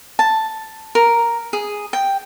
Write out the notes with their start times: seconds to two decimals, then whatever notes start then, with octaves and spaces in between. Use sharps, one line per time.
0.19 A5
0.95 A#4
1.53 G#4
1.93 G5